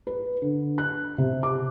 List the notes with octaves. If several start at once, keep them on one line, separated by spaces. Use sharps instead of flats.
B4
D3
F#6
C3
D6